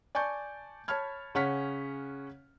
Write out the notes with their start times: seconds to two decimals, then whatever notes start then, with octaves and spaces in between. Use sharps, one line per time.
0.15 D5 G#5 A5 C#6 G6
0.88 C#5 A5 B5 F6 G#6
1.35 C#3 C#4 F#5 C#6 F6 B6